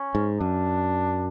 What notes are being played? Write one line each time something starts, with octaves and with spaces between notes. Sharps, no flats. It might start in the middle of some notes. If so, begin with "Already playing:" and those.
Already playing: C#4
G#2
F#2 D4